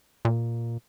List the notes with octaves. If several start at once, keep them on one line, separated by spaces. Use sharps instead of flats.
A#2